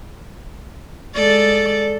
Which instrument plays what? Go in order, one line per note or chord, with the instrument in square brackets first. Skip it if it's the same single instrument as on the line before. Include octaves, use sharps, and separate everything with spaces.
[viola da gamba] G#3 A4 D5